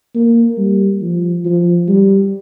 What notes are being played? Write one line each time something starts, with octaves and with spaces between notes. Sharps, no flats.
A#3
G3
F3
F3
G3